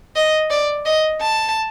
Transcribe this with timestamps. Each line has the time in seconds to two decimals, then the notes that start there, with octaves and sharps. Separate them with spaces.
0.16 D#5
0.50 D5
0.86 D#5
1.21 A5